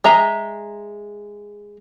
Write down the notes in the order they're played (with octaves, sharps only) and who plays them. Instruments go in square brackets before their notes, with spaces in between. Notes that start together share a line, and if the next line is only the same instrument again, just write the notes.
[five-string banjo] G#3 E5 A#5